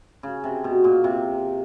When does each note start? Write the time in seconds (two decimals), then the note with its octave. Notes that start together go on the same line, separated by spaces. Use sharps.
0.23 C#3
0.44 C3
0.64 B2
0.84 A#2
1.04 C3